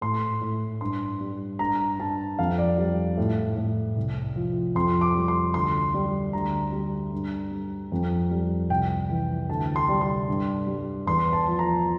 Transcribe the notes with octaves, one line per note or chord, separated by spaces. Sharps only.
A2 C6
A2
G2 C6
G3
G2 A#5
G2 A5
F2 F5
D5
G3
A2
A2
C2
F3
F2 C6
D6
G3
C6
D2 C6
G3
D2 A#5
G3
G2
G3
F2
G3
C2 G5
E3
D2 A5
C6
G3
C6
G2
G3
E2 C6
A5
F3
A#5